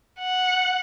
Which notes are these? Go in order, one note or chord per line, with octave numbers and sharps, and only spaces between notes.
F#5